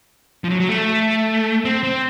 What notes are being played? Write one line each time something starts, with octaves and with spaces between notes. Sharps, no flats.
F3
F#3
F#3
A3
C4
C4